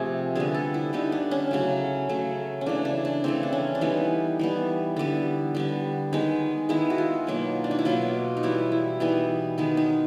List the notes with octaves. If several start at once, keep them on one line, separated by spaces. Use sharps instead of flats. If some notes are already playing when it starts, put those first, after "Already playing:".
Already playing: C3 F3 A3 G#4
D3 G3 B3 G#4
A4
E4
D3 G3 B3 D#4
D4
C#4
C#3 F#3 A3
C#3 F#3 A3
C#4
C#3 E3 A3 D4
D4
D4
C#3 E3 A3 C4
D4
C#4
D4
E3 G3 B3 D#4
E3 G3 B3
D3 G3 B3
D3 G3 B3
D#3 G#3 B3 D#4
D#3 G#3 B3 E4
F#4
F4
B2 F#3 A#3
D4
D#4
E4
B2 F#3 A#3 F4
D#4
E3 G3 B3 E4
E4
E3 G3 B3 D#4
D#3 G#3 B3 D#4
D#4